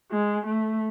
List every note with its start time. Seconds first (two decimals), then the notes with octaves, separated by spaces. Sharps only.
0.12 G#3
0.46 A3